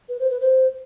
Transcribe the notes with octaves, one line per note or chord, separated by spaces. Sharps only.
B4
C5
B4
C5